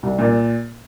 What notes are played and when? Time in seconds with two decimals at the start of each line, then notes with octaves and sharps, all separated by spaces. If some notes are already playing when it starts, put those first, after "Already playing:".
0.03 C2
0.19 A#2